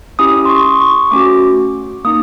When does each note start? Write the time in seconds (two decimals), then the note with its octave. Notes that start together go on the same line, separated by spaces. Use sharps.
0.19 C#4 E4 G4 D#6
0.45 C6
0.50 C#6
0.81 C#6
1.11 A3 C#4 F#4 D6
2.05 A#3 D#4 D#6